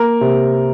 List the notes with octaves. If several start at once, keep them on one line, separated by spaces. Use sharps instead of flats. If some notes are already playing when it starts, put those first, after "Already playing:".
Already playing: A#3 A#4
C3